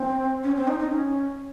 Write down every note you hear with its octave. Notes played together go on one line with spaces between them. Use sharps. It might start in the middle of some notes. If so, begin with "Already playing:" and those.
Already playing: C4
C#4
C4
D#4
D#4
C#4